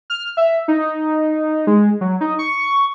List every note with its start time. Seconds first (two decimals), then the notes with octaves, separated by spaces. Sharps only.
0.10 F6
0.37 E5
0.68 D#4
1.67 G#3
2.01 F#3
2.21 D#4
2.39 C#6